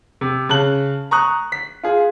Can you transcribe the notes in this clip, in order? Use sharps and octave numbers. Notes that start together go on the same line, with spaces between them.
C3
C#3 A5 F#6 F#7
A#5 C#6 D#6 F#6
B6
F4 G#4